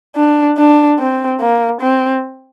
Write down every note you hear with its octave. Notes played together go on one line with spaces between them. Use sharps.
D4
D4
C4
A#3
C4